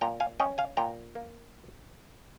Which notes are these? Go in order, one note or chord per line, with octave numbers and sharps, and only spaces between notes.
A#2 G5 A#5
F5 G#5
C#4 D#5 G5
F5 G#5
A#2 G5 A#5
A#3